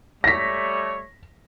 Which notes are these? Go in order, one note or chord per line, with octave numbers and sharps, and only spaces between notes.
G3 A3 C#5 A#6 B6